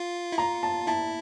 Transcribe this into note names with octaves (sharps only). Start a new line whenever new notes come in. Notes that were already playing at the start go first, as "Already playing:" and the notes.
Already playing: F4
E4
F4 A#5
A5
E4 A5